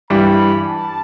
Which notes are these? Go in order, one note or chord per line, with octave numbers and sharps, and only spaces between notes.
G2 E3 G3 B5
A5